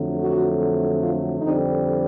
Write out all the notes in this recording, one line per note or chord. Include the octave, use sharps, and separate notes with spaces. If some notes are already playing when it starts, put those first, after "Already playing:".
Already playing: F2 D3 F#3 A3
F#4
F4
F2 D3 G3 C4 D#4